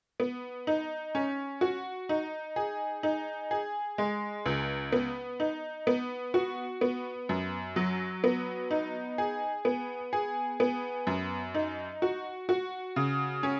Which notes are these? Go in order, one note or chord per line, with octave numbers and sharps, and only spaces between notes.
B3
D#4
C#4
F#4
D#4
G#4
D#4
G#4
G#3
C#2
B3
D#4
B3
F#4
B3
F#2
F#3
B3
D#4
G#4
B3
G#4
B3
F#2
D#4
F#4
F#4
C#3
C#4